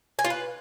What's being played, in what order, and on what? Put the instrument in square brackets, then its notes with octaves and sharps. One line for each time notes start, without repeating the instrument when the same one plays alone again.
[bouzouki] G#5
F4
B4